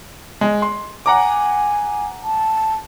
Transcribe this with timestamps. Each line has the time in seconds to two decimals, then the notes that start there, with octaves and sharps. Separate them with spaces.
0.41 G#3
0.62 C6
1.06 F#5 G#5 A#5 D6
2.23 A5